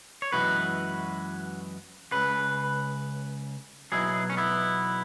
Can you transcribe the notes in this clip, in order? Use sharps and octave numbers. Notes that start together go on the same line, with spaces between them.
C#5
F#2 E3 G#3 F#4 B4
C#2 C#3 B4
B1 B2 F#3 E4 G#4
C#4
B3 E4